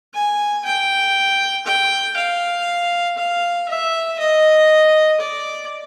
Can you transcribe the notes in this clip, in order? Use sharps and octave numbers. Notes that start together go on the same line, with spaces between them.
G#5
G5
G5
F5
F5
E5
D#5
D5